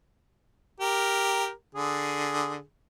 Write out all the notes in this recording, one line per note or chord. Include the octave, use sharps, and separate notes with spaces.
G4 A#4
D3 G#4